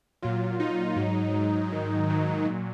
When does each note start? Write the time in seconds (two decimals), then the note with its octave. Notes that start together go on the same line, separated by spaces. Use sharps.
0.22 A#2 F#3 F4
0.60 A#2 F#3 D#4
0.96 G#2 F#3
1.34 G#2 F#3
1.71 G#2 D#3 F#3
2.08 G#2 D#3 F#3
2.45 A#2 F#3